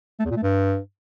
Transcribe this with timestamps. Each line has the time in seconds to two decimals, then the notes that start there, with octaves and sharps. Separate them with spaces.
0.20 A3
0.25 E2
0.31 A#2
0.37 A3
0.43 G2